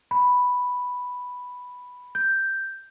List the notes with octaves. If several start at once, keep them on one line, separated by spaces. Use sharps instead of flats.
B5
G6